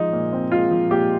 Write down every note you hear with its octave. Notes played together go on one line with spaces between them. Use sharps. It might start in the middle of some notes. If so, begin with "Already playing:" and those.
Already playing: F3 G#3 D#4
A#2
C4
G#3 F4
F3
A#2 G4